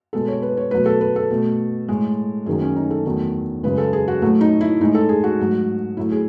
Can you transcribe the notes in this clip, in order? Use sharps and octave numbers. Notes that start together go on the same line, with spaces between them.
B2 G#3 A4
C#5
B4
C#5
B2 F#3 A3 B4
A4
B4
A4
B2 A3
A2 G#3
F#2 D#3 F#3 G#4
C#4
D#4
A4
E2 D#3 F#3 A3
F#2 C#3 G#3 B4
A4
G#4
F#4
A2 F#3 A3
D#4
E4
A2 G#3 D#4
A4
G#4
F#4
G#2 F#3 A3
A2 F#3 A3 E4
G#4